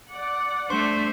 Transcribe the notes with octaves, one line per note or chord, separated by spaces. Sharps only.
D5 F#5
A3 D4 C5 C6 C#6